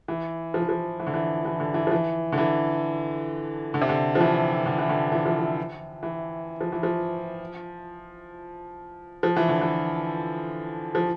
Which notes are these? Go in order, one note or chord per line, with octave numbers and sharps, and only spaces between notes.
E3
F3
E3
F3
E3
D3
E3
E3
D3
E3
F3
E3
D3
E3
D3
C3
D3
F3
E3
D3
E3
D3
E3
F3
E3
E3
F3
E3
F3
F3
E3
D3
E3
F3